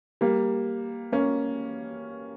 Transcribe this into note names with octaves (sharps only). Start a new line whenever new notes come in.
G3 A#3
A#3 C#4